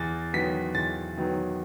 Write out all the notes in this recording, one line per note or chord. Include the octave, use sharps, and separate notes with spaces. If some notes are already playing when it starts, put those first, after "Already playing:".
Already playing: E2 A6
D#3 F#3 B3 B6
E2 A6
D#3 F#3 B3